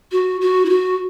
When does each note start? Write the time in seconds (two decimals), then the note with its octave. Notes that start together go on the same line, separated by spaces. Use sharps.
0.12 F#4
0.41 F#4
0.66 E4
0.69 F#4